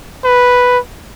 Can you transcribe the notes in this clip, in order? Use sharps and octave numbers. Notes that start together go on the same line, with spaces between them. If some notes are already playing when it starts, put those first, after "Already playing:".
B4